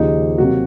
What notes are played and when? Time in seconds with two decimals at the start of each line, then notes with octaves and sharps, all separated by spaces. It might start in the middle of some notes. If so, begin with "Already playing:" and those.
Already playing: D#2 C#3 F3 D#4
0.38 C3 F#3 A#3 F#4